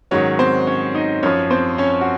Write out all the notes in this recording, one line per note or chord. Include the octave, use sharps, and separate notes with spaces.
G#2 D#3 F#3 C#4 C#5
C4 C5
C#4 C#5
D#4 D#5
F#2 F3 C#4 C#5
C4 C5
C#4 C#5
F#4